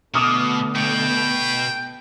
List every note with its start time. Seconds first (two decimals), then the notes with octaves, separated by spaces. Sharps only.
0.14 B2 D3 A3 B3 D6 D#6 F6
0.75 B2 G5